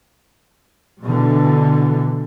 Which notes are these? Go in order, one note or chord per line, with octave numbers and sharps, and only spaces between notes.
B2 D3 E3